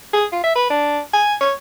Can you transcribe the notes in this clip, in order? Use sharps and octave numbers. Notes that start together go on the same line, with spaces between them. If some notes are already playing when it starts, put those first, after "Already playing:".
G#4
F4
E5
B4
D4
G#5
C#5